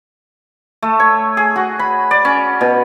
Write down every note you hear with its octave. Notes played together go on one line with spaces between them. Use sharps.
A3
C#5
G#4
F#4
B5
D5
C#4
B2